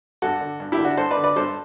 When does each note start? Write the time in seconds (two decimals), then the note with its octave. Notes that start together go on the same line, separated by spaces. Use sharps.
0.22 G2 F#4 A4
0.41 D3
0.60 G2
0.72 E4 G4
0.78 D3
0.85 D4 F#4
0.97 G2 A4 C5
1.11 B4 D5
1.17 D3
1.24 B4 D5
1.36 G2 A4 C5